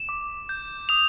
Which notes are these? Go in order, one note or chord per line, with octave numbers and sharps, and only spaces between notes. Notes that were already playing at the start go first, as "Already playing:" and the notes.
Already playing: E7
D6
G6
D#6 F7